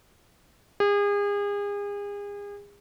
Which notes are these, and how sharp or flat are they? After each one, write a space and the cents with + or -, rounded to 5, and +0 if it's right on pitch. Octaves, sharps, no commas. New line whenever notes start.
G#4 -35